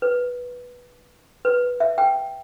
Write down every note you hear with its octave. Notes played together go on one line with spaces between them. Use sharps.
B4
B4
E5
G5